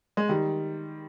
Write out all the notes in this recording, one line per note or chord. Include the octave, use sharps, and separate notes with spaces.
G#3
D#3 G3